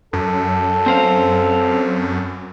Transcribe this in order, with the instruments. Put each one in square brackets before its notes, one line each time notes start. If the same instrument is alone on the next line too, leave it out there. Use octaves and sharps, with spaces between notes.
[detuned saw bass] F#2 [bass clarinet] A4
[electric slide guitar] C4 C5 F5